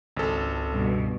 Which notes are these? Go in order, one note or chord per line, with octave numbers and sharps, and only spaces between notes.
G#1 C#2 A4
G2 B2